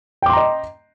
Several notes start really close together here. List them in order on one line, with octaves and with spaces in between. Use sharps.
G5 D6 C6 A#5 D#5